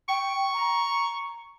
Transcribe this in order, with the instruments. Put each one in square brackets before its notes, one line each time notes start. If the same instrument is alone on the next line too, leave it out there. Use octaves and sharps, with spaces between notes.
[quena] G5 [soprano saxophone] C#6
[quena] A#5